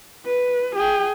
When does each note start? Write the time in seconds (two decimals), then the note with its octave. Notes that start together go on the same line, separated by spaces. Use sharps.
0.25 B4
0.75 G#4 G5